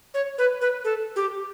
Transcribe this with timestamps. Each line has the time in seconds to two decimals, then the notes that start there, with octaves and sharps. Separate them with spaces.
0.14 C#5
0.38 B4
0.61 B4
0.84 A4
1.16 G4